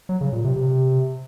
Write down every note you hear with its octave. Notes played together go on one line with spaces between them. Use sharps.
F#3
C#3
A#2
C3
C3